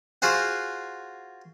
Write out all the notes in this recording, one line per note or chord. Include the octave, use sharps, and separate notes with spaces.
F4 F#4 G#4 C5 F#5